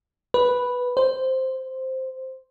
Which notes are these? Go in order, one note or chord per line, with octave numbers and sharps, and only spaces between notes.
B4
C5